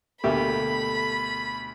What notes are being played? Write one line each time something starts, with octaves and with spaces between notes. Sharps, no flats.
D2 B2 A#3 G4 A4 E5 B5 C#6